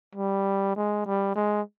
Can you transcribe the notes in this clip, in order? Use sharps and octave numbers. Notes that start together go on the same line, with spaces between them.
G3
G#3
G3
G#3